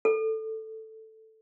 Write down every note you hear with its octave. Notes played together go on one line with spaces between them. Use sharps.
A4